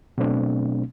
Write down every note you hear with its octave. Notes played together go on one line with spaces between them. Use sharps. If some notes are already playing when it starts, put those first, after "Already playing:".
B2 F#3 A3 C4 D4